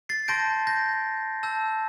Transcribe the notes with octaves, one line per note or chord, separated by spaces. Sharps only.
A6 C7
A5 C6 G6 A#6 D7
G6 A#6
A5 E6 G6